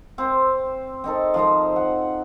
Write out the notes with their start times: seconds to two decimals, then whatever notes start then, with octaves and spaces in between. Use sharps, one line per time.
0.18 C4 C5
1.04 C4 D#4 A4
1.34 F3 D#4 C5 A#5
1.76 F#5